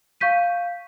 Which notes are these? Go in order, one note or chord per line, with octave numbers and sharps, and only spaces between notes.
F5 C#6 G6 B6 D#7